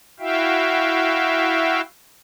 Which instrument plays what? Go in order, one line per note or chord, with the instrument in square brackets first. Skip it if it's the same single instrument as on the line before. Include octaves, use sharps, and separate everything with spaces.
[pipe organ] E4 F#4 E5 F5 G5